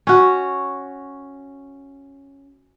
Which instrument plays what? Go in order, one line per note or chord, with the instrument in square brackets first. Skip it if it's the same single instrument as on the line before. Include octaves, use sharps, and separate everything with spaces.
[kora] C#4 F#4